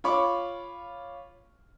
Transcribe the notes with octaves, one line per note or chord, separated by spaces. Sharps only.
F4 C#5 B5 C#6 D6